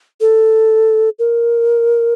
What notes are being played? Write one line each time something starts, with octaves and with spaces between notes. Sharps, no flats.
A4
A#4